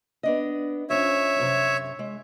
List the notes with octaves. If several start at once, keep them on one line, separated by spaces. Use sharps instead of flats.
B3 D4 D#5
F2 C#4 C#5 E5
F#2 C3 A#5
G#3